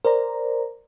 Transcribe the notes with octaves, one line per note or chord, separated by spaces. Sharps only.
A#4 C5 D5 A#5